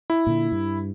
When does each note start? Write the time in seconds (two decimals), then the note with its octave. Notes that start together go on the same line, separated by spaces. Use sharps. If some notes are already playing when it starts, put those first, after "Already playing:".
0.10 E4
0.27 A#2 D3
0.52 G2